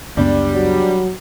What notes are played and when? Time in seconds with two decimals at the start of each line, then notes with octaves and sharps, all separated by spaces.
0.17 C#2 F#2 G3 B3 D4
0.54 F#3